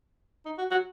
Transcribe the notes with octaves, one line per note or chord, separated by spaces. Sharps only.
D#4
F#4
F#4